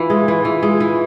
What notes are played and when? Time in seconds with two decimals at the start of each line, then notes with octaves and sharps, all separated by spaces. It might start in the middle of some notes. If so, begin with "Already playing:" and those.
Already playing: E3 F4
0.10 G#3
0.28 E3
0.45 E3
0.63 G#3
0.80 E3